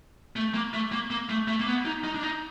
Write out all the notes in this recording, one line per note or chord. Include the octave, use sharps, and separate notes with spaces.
A3
A#3
A3
A#3
A#3
A3
A3
A#3
B3
D#4
D#4
D4
D#4